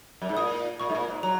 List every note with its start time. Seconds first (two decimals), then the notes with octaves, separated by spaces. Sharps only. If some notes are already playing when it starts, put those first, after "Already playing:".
0.22 F#2
0.29 G#2
0.37 A#2 D#6
0.80 A#2 C#6
0.90 G#2
0.95 A#2
1.08 G#2
1.23 F#3 A#5